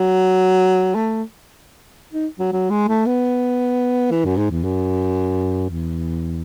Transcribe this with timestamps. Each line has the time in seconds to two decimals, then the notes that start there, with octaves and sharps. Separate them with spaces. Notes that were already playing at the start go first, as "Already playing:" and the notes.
Already playing: F#3
0.95 A3
2.13 D#4
2.39 F#3
2.52 F#3
2.70 G#3
2.88 A3
3.06 B3
4.11 E3
4.25 F#2
4.37 G#2
4.50 E2
4.64 F#2
5.69 E2